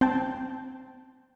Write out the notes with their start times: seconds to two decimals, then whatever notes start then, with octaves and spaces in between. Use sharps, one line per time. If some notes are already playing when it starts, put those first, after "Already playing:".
0.01 C4 G5 A5